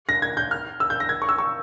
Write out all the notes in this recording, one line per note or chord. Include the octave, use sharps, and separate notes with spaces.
A#6
G#6
G6
F6
E6
G6
A#6
G#6
C#6
E6
C#6